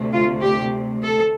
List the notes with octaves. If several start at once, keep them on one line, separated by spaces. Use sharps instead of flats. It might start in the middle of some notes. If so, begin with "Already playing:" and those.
Already playing: D2 C3 A3
F4
G4
A4